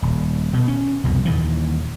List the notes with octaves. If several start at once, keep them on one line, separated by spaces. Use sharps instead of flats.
D#1
B2
C#4
C2 F2 B2
D#2 A#2 E3